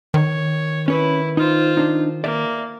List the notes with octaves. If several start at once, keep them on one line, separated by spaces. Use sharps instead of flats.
D#3 C#5
C#4 E4 B4 C#5
D#4 F4 C5
D4 D#4
A#3 D5 E5